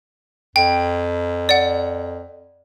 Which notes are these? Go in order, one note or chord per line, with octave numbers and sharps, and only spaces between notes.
F2 G5
D5 F#5